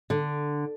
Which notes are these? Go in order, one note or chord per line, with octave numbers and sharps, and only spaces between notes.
D3